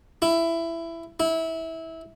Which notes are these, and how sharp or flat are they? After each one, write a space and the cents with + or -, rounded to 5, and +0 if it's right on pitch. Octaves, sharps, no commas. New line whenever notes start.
E4 +15
E4 -20